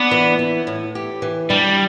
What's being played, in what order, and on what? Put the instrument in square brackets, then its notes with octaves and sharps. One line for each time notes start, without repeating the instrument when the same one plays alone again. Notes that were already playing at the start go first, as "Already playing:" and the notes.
Already playing: [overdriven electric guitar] B3 [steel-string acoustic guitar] D4
[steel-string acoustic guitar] E3
E4
A2
G4
E3
[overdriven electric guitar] G3 [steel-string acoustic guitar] D4